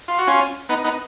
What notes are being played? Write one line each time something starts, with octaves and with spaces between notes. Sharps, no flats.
F4
F#4
C#4 F4
B3 D#4
B3 D#4